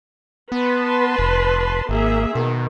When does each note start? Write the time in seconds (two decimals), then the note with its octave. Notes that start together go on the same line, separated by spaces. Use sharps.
0.52 B3 B4 A5 C6
1.18 F1
1.89 G#1 A#3 G#4 E5
2.35 B2 D#3